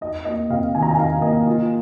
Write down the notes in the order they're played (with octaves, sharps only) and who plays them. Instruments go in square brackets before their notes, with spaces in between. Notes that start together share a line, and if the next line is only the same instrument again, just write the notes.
[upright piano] D#4 [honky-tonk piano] D#5
[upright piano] A#3 [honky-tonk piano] D#5
[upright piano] C3 [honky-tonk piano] F5
[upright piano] D#3 [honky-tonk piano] G#5
[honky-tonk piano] A#5
G#5
[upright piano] D#4 [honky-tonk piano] F5
[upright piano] A#3 [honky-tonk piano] D#5
[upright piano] F4